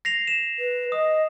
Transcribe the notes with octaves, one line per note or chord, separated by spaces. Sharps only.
A#6 C7 F7
E7
B4
D#5 D#6